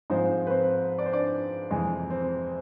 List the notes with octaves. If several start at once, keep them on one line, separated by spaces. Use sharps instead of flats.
G#2 F3 G#3 C4 C5
B4
C4 C5
D5
C5
D4 D5
F2 C3 E3 G#3 G#4
C4